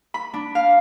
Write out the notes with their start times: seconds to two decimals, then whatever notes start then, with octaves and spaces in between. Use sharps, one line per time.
0.14 B5
0.34 D4
0.55 F5